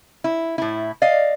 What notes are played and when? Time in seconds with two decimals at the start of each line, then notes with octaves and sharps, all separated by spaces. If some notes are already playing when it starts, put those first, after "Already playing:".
0.24 E4
0.58 A2 E4
1.02 D5 D#5 F5